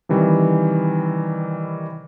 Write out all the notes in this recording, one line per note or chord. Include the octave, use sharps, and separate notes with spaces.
C3 D#3 E3 G3